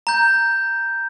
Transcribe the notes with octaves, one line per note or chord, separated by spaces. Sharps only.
A#5 G6